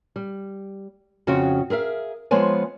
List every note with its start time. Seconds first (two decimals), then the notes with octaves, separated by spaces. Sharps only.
0.16 G3
1.27 F2 C#3 C#4 F#4 G5
1.70 G#4 A#4 E5 F5
2.31 F3 G#3 B3 C5 C#5 G#5